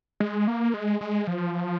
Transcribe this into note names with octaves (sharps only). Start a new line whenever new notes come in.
G#3
A#3
G#3
G#3
F3